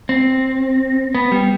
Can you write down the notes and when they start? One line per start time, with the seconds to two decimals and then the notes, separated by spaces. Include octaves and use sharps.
0.09 C4
1.15 B3
1.32 G3